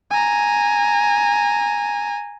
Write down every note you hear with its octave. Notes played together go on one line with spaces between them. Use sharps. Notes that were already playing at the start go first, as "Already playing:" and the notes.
G#5 A#5